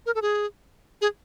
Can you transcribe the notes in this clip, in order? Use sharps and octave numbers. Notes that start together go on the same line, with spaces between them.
A#4
A4
G#4
G#4